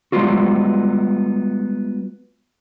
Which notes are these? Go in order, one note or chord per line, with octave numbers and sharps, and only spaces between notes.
G3 G#3 B3 F4 F#4